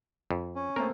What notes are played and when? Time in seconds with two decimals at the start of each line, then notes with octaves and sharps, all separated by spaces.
0.31 F2
0.55 C#4
0.76 A3 A#3 C4 A#4